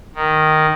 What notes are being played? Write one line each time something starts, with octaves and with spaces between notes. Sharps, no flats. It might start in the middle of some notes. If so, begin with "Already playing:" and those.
D#3